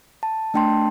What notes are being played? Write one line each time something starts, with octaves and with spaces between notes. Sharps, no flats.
A5
A3 D4 G5 A5 C6